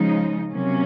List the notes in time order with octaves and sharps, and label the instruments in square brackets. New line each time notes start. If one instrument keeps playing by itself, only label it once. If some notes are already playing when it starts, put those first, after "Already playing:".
Already playing: [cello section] C#3 F3 G#3 D#4
C3 F#3 A#3 C#4